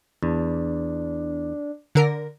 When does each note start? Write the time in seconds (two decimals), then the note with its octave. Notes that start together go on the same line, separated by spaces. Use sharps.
0.23 E2 D4
1.95 D3 A#4